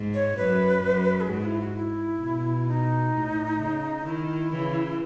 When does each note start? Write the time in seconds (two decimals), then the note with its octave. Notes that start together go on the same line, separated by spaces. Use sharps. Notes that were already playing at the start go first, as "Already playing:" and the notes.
Already playing: G#2
0.14 C#5
0.37 F#2 B4
0.83 F#2
1.21 G#4
1.29 G#2 F#4
1.41 F#4
1.45 E4
1.60 F#4
1.76 E4
2.22 B2
2.68 D#4
3.14 A2
3.60 C#3
4.06 D#3 E4
4.52 C#3 E3